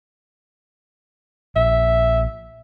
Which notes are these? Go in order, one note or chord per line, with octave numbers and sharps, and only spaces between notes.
A#1 E5